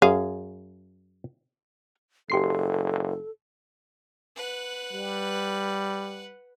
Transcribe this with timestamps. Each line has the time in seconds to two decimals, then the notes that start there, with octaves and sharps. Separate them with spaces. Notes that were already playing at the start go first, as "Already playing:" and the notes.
0.02 F#2 G#4 F5
2.30 F#1 G4 A4 C6 C7
4.36 B4 F#5
4.93 G3